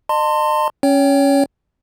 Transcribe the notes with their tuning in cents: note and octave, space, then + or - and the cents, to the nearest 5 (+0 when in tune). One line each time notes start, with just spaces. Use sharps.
D#5 -35 A5 +30 C6 +0
C#4 +0 C#5 +25 G5 +0